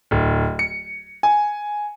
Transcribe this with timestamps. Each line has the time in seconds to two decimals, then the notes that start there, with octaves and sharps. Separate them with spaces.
0.11 D1
0.59 C#7
1.23 G#5